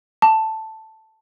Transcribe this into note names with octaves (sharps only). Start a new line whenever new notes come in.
A5